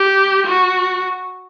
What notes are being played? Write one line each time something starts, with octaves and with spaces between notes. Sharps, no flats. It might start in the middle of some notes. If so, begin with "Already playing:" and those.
Already playing: G4
F#4